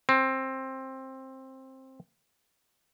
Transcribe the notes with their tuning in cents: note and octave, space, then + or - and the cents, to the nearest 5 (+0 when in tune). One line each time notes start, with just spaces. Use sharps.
C4 +15